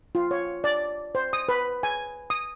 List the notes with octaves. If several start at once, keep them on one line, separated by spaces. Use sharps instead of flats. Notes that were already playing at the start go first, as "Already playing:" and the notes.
F4
C#5
D5
C5
D#6
B4
G#5
D#6